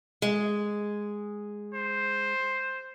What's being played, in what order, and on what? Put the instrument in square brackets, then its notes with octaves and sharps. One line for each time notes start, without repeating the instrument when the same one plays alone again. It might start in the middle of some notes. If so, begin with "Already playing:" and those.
[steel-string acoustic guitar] G#3
[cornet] C5